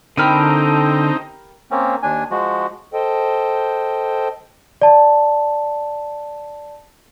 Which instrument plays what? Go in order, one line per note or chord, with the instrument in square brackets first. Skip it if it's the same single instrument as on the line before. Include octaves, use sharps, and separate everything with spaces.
[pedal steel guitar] D3 F6 [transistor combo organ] C4 D#4 [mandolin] G4 A#4 B5 [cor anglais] A4
[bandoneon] A#3 C4 C#4
D#2 D4 G#5
F3 G#3 F#4
[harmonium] A4 C5 D#5 G5
[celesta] D5 A5